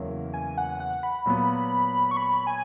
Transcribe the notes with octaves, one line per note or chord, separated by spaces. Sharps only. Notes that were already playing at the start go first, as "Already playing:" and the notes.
Already playing: E2 C#3 F#3 A#3 E4
G#5
F#5
F#5
B5
A#2 F#3 B3
C#6
B5
G#5